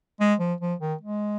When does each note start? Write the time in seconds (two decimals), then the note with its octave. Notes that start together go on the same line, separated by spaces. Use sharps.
0.20 G#3
0.40 F3
0.60 F3
0.80 D#3
1.01 G#3